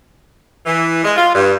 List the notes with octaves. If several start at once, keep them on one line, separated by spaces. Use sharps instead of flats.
E3
G#3
F4
G2